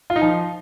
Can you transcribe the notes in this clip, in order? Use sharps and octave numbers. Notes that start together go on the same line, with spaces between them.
F4
D#4
F3